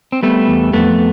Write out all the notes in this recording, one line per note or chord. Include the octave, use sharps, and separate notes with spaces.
C4
G3 A3 B3
E2
F2 A3 B3